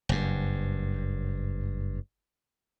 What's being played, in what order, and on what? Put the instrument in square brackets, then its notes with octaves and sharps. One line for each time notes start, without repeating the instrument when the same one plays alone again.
[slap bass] F#1 G2